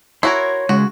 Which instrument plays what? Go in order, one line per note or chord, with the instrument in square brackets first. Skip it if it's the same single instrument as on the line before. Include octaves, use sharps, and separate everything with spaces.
[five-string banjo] E4 F#4 A#4 [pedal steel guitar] C#5 C6
[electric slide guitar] C#3 G#3 [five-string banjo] F#4